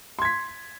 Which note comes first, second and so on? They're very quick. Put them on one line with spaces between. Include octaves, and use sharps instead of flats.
C6 G#6 B6